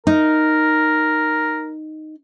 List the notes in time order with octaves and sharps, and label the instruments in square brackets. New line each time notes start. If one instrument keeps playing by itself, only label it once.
[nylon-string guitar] D#4 [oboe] A#4